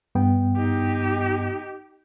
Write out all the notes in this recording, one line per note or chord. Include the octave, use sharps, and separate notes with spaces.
G2 B3 G5
D#4 G4